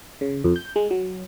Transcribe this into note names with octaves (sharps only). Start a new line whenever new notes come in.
C#3
F2
G6
G#3
F#3